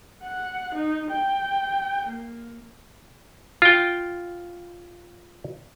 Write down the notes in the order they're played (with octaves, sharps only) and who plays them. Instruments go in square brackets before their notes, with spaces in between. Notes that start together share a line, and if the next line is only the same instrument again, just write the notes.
[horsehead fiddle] F#5
D#4
G5
A#3
[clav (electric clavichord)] F4 G5